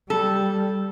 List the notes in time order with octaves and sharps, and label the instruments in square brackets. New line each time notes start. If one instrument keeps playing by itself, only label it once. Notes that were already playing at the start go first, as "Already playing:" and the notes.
[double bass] G3 [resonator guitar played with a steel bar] A4